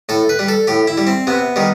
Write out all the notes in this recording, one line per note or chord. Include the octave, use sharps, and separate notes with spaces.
A2 A4
B4
G3
A4
A2 G4
E4
G3
C4
C3 B3
D#3 G3